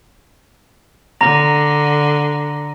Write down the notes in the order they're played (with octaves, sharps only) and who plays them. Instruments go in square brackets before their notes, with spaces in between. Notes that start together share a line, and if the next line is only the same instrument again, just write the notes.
[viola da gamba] D3 [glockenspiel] A#5 A#6